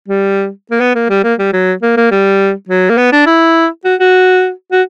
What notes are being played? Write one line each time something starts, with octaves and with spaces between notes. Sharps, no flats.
G3
A#3
B3
A#3
G3
A#3
G3
F#3
A#3
A#3
G3
F#3
A#3
B3
D4
E4
F#4
F#4
F#4